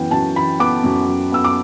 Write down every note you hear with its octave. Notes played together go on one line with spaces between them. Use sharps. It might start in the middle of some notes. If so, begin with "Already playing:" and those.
Already playing: F#2 E3 B3 G5
F#2 A5
E3 B5
B3 D6
F#2
F#2
B3 E6
D6